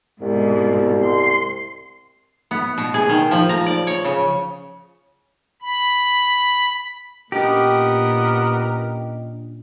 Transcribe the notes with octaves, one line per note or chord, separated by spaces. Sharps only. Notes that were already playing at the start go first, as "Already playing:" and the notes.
C2 G#2 B2
C6
B3
B2
G#4
D#3
F3
A#5
D5
C#5
C#3
B5
A#2 B3 C#4 D4 G4 A#4 D#5